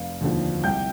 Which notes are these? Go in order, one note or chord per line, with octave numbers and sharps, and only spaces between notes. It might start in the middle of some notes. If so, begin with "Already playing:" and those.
Already playing: F1 F5
D#2 D3 F3
C2 G5 G6